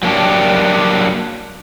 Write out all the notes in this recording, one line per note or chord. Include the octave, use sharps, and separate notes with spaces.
F#3 A#3 C4 D4 G4